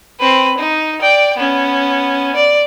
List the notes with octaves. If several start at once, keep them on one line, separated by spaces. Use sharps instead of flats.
C4 B4
D#4
D5 G5
B3 C#4
D5